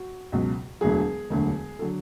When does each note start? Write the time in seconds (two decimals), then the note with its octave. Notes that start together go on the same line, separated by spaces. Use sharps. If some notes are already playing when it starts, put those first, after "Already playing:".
Already playing: F#4
0.32 C#2 B2 F#3
0.81 E1 D2 D3 F#3 G#4
1.30 E1 D2 D3 F#3
1.79 D3 F#3 A4